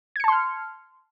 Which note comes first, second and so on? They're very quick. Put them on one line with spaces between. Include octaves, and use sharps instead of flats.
G#6 C#7 A5 C6 F6